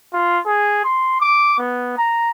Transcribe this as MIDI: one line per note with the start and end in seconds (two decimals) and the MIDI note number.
0.13 0.39 65
0.46 0.80 68
0.84 1.20 84
1.21 1.57 86
1.58 1.93 59
1.98 2.30 82